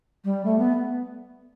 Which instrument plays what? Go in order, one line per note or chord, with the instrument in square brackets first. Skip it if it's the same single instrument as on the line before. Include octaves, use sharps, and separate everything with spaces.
[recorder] G3
A3
B3